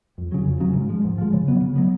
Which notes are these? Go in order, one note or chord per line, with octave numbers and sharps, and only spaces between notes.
F2
C#3 F#3
F2
C#3 F#3
G#2
F3 G#3
G#2
F3 G#3
C#3
F#3 B3
C#3
F#3 B3